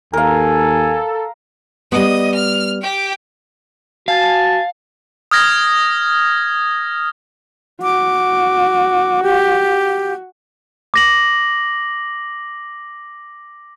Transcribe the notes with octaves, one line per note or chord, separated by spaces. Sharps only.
D#2 A4 A#4 F5 G#5
G3 B3 D#5
F6
G4 G5
F#4 F5 G#5 A5
D#6 F6 G#6 A#6
F#4 D6
G4
D6 A#6 F#7